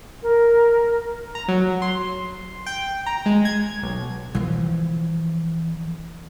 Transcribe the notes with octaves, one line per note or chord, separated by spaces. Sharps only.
A#4
A#5
F#3
C6
G5
A#5
G#3
G#6
B1
E3 F3